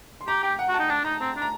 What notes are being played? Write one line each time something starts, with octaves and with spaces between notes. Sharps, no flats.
C6
G4 A#5
G4 G5
F#5
F#4
A5
D#4
D4 A5
D#4 A#5
C4 A#5
D4
A#5